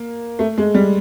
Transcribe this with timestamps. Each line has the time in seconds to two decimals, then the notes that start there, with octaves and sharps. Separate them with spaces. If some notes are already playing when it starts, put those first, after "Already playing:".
Already playing: A#3
0.39 A3
0.58 G#3
0.74 G3